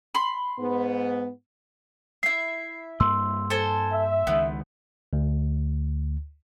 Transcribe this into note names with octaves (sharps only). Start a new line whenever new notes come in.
B5 C6
G#2 B3
E4 E5 C7
G2 A#3 C6 E6
A4 C5 G#5
E5
C#2 D#3 G#3 B3
D2